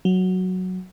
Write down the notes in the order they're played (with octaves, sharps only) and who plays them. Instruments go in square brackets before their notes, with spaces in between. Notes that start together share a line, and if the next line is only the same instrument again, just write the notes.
[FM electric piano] F#3